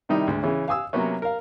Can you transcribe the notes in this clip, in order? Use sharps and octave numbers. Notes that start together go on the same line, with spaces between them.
C3 D#3 G3 D#4 E4
D2 G#2
C#3 E3 C#4
F5 G#5 D#6 E6
C3 F#3 A#3 B3 C#4
A#4 F5